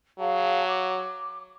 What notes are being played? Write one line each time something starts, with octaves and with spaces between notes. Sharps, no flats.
F#3 G#4 F5 A5
D6